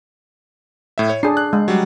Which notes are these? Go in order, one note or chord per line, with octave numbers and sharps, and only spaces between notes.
A2 E5
C#5
D4 G#4 C7
F#6
G#3
F#3 G3